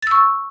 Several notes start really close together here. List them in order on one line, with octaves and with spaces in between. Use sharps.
A6 E6 C#6